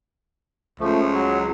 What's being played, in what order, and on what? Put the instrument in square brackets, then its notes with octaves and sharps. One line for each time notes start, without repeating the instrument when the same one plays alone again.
[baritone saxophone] C#2 [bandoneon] F3 A3
[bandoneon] F#3